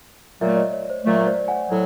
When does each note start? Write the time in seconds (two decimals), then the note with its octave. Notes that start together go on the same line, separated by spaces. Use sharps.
0.40 A#2 F#3 A3 D5 E5
0.56 C#5 D#5
0.73 C#5
0.90 C5
1.05 A#2 F#3 A3
1.27 C5 D5
1.48 F#5 G#5
1.70 A2 F#3